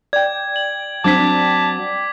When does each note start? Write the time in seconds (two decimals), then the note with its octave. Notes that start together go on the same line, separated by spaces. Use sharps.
0.13 D5 G5 G#6
0.56 F#7
1.04 F#3 C4 D4 A5 D6 G#6 B6